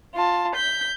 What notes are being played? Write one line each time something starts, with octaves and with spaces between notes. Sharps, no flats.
F4 A5
G6 B6